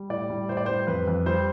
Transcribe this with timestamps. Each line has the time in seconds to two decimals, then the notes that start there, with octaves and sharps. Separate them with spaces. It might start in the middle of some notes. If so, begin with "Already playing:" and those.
Already playing: G3
0.10 A2 D5
0.30 G3
0.49 A2 C5
0.57 D5
0.66 G3 C5
0.87 F2 B4
1.07 F2
1.26 G3 C5